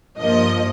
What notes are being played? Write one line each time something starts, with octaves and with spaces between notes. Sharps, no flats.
G2 F3 A#3 D#5